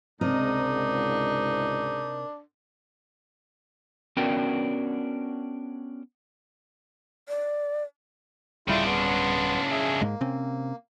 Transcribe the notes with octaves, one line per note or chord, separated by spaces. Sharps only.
C#2 G#2 C3 D4 D#4 A#4 D#5
B3 C#4 D4 F#4 A#4 G5
D5
D1 C#3 G3 D4 E4 F4 G5
B3 C6
G#4 E5 G#5
G#2 G#3 A#3
C3 C4 C#4